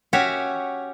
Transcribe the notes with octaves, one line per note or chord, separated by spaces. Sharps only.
C#4 F#4 G4 C#5 E5